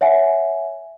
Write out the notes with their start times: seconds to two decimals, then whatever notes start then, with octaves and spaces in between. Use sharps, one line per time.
0.01 C#5 E5 F#5 G#5